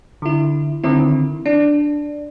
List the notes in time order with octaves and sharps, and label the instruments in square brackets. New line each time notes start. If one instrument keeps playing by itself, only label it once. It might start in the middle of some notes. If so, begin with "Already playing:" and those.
[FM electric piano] D3 E4
D3 D#3 C4 E4
D4